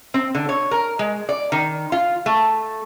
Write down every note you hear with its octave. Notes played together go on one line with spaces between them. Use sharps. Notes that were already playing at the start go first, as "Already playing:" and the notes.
C4
D3
C#5
A#4
G#3
D5
D#3
F4
A3